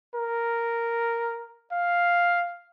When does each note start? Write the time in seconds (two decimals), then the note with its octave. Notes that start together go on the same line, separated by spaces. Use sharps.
0.15 A#4
1.72 F5